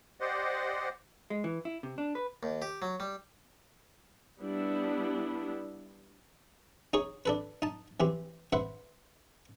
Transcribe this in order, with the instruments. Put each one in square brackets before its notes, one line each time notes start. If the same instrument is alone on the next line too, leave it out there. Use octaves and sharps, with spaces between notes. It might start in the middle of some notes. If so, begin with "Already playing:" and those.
[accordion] G4 C5 D5 D#5 F#5
[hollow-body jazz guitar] G#3
E3
E4
C3
D4
B4
[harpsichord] D#2
G4
F#3
G3
[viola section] G3 B3 D4 E4
[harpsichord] D#4 G#4 C#5
D4 A4 B4
D#4 A5
E3 C4 G4
B4 C5 E5 F#5